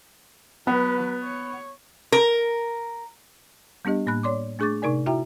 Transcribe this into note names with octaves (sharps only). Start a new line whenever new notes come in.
F#3 B3 B4
C#5
A#4
G3 B3 D4 G4 D#5
A2 A#3 B5 F#6
C#5 D5 C6 D6
A3 D4 G#4 C#6 D6 A6
C3 D#4 A#4 D5 G#5
E4 F#4 E5 G5 A#5